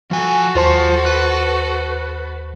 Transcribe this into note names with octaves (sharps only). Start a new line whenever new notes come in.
F3 F#4 A4 G#5
D#2 F4 C5 A5 C6
B4